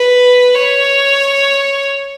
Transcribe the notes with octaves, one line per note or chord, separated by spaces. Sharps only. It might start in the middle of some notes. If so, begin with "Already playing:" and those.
Already playing: B4
C#5